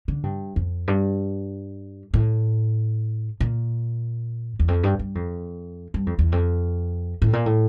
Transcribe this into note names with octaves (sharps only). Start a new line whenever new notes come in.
D3
G2
F2
G2
A2
A#2
E2
F2
G2
G2
F2
G2
F2
E2
F2
A2
A#2
A2